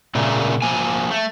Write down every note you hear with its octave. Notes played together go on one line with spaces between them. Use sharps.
A#2 C#3 A3 A#3
F3 A#3 G#5
A3